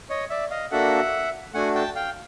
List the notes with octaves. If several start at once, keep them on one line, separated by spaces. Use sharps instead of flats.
C#5 D#5
D5 E5
D#5 F5
A#3 D4 F#4 A4 E5 F#5
A3 D4 F#4 F#5 G#5
G5 A5
F5 G5